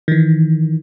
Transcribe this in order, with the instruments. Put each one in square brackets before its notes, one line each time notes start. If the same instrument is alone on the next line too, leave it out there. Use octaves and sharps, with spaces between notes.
[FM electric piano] D#3 E3